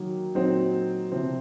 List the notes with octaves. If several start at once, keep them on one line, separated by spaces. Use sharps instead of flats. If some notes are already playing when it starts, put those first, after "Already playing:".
Already playing: D#3 F#3 A#3
A#2 F#3 C4 D#4
C3 F3 C4